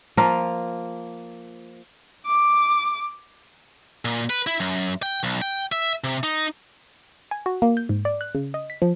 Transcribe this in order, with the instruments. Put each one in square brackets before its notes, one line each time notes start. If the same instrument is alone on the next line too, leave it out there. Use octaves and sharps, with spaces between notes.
[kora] F3 A#3 F4 A#4
[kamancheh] D6
[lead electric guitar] A#2
B4
E4
F#2
G5
B1
G5
E5
C3
D#4
[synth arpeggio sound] G#5
F#4
A#3
G6
G#2
D5
F#6
C#3
D#5
B6
F3